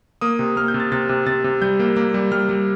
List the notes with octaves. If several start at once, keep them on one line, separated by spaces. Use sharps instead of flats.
A#3 D#6
C3
A#3 F6
G6
C3
A6
C3 A6
C3
C3 A6
C3
G3 G6
A#3
A#3
G3
G3 F6
G3